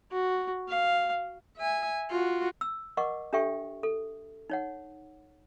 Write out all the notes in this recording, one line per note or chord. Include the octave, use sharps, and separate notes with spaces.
F#4
F5
E5 G#5
F4 F#4
E6
A#4 D#5 F#5 C#6 D6
D4 G4 A4 E5 G5 C#6
A4
D#4 C#5 F#5